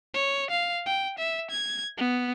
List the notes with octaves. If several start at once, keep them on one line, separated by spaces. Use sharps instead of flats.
C#5
F5
G5
E5
G#6
B3